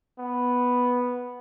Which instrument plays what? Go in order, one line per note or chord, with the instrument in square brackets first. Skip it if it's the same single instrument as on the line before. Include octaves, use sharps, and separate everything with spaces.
[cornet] B3